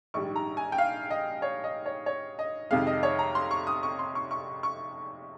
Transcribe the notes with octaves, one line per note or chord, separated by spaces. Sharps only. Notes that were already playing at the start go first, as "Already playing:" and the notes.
A#1 G#2 D#3 G3 C#6
A#5
G#5
G5
F5
D#5
C#5
D#5
C#5
C#5
D#5
F2 C3 D#3 G#3 F5
D#5
C#5
A#5
C6
C#6
D#6
C#6
C6
C#6
C#6
C#6